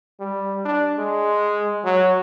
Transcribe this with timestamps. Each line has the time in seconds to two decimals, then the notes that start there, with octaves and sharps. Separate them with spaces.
0.20 G3
0.65 D4
0.98 G#3
1.84 F#3